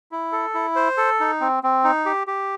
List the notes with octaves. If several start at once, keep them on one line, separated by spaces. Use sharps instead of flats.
E4
A4
E4
C5
A4
D#4
C4
C4
D#4
G4
G4